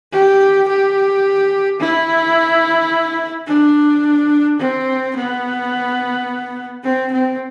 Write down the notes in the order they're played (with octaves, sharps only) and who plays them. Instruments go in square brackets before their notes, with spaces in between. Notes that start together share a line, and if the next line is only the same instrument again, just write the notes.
[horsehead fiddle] G4
G4
E4
D4
C4
B3
C4
C4